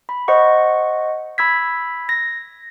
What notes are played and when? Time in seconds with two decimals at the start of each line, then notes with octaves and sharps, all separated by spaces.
0.09 B5
0.28 C5 D#5 F#5 C#6
1.38 B5 E6 G#6 B6
2.09 A#6